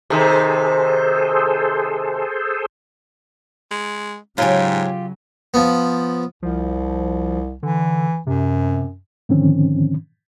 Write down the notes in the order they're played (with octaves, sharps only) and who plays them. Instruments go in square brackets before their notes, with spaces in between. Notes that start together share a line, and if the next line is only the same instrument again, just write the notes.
[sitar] C3 D#3 [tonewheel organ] G#4 A4 C5
[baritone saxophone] G#3
[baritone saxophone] G#2 [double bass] C#3 F#3 [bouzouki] F4 G4 [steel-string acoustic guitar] C#5 G5 G#5
[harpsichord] F3 B3
[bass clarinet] C2 [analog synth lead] F3
[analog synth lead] D3 [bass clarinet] E3
[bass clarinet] F#2 [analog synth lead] C3
[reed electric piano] G#2 D3 D#3 F3 C4 C#4